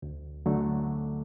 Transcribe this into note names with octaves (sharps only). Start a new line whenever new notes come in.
D2
D3 F#3 A3